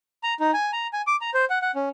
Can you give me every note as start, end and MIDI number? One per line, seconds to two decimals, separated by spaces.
0.23 0.34 82
0.40 0.51 63
0.54 0.71 80
0.73 0.87 82
0.93 1.02 80
1.07 1.16 86
1.21 1.30 82
1.34 1.45 72
1.50 1.59 78
1.62 1.71 78
1.75 1.89 61